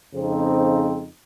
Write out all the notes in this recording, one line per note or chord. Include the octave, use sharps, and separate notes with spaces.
F2 C#3 G#3 C4 D#4